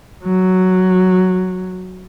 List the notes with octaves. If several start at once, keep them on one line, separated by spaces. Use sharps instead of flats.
F#3